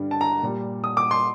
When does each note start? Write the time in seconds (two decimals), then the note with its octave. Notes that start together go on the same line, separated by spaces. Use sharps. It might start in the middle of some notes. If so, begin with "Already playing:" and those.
Already playing: G2 D3 G3
0.11 A5
0.21 A#5
0.43 A#2 G3
0.84 D#6
0.97 D6
1.11 C6